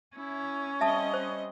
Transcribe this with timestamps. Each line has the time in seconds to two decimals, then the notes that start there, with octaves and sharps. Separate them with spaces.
0.16 C#4 E4
0.81 G3 C4 D#5 E5 A5 D#6
1.14 C5